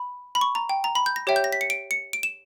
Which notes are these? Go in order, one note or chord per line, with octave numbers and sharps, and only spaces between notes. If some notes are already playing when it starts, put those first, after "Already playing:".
Already playing: B5
B5
C#6
A#5
G5
A#5
B5
G6
A#6
G4 C#5 E5 G5
G6
A#6
B6
C#7
D7
C#7
D7
E7